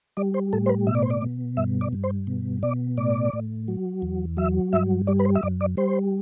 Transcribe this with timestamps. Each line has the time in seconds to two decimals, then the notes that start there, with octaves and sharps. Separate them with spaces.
0.17 G3 D5
0.34 C5
0.53 A2 A4
0.66 C5
0.69 B4
0.87 B2 E5
0.95 D5
1.02 C5
1.10 D5
1.22 B2
1.57 G2 E5
1.81 D5
1.93 G2
2.04 C5
2.27 B2
2.63 B2 D5
2.97 A2 D5
3.33 A2
3.68 F#3
4.02 E2
4.37 F#3 E5
4.73 G2 E5
5.07 G3 D5
5.19 B4
5.25 C5
5.35 E5
5.43 F#2 D5
5.61 D5
5.77 G3 C5